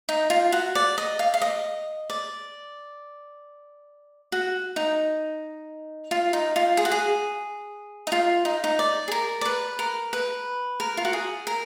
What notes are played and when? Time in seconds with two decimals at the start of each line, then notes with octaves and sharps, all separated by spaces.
0.09 D#4
0.30 F4
0.52 F#4
0.75 D5
0.98 D#5
1.19 F5
1.34 F5
1.42 D#5
2.10 D5
4.32 F#4
4.76 D#4
6.11 F4
6.33 D#4
6.56 F4
6.77 G#4
6.85 F#4
6.92 G#4
8.07 D#4
8.12 F4
8.45 D#4
8.64 D#4
8.79 D5
9.08 G#4
9.12 A#4
9.41 D5
9.45 B4
9.79 A#4
10.13 B4
10.80 A#4
10.97 F4
11.05 F#4
11.13 G#4
11.47 A#4